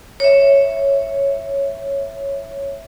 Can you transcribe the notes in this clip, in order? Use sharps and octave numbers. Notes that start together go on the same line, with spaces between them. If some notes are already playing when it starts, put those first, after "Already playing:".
C#5 E5